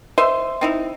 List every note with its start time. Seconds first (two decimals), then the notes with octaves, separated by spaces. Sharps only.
0.18 C5 D#5 E5 C6
0.61 C4 D#4 E4